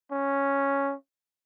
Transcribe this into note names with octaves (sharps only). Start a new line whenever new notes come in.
C#4